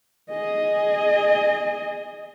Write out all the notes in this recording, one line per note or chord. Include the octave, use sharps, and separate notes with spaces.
G#4 D#5